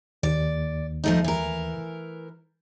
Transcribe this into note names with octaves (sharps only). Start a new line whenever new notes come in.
D#2 D5
F3 A3 D#4
E3 A#4